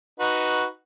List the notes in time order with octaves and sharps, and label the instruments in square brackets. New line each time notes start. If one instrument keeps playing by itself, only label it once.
[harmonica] D#4 F#4 B4